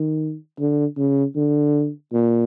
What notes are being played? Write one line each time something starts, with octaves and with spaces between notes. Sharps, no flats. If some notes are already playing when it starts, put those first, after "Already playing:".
Already playing: D#3
D3
C#3
D3
A#2